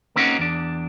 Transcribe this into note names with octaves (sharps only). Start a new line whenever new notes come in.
A#3 C4 C#4 D#4 F4 F#4
E2 D4